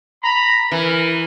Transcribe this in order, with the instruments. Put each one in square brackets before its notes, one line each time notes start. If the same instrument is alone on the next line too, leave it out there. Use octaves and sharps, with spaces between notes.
[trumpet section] A#5 B5
[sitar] E3 [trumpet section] A#4